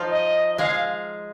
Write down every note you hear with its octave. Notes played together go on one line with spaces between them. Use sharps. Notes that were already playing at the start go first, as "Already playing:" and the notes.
Already playing: F3 D#4 F4
D#5
D#5
G#3 G#4 F5